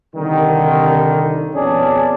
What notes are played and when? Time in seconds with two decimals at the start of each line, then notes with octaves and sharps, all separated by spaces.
0.14 C2 D3 D#3
1.54 F2 B2 C#4 G#4 D5 A5